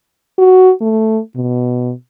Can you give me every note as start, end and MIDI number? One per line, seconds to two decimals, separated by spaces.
0.38 0.72 66
0.81 1.20 57
1.36 1.93 47